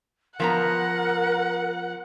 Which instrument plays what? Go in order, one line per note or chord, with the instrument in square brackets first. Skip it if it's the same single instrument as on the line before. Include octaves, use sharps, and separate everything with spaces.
[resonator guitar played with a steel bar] F3 B3 A#5 [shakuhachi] A#4 [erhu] F#5